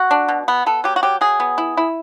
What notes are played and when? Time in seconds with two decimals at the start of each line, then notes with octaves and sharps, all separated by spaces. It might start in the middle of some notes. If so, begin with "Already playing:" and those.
Already playing: F#4
0.11 D4
0.28 B2
0.48 B3
0.66 B3 A4
0.84 F#3 G4
0.96 F#4
1.03 F#3 G4
1.21 F#3 G#4
1.40 B3
1.58 E4
1.77 E4